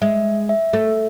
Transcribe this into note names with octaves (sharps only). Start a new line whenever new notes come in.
G#3 E5
E5
A3